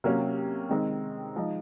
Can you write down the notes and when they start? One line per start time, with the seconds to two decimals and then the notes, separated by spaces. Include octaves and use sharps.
0.04 C3 F#3 A#3 C#4
0.69 D#3 G#3 C4 D#4
1.36 F3 G#3 D#4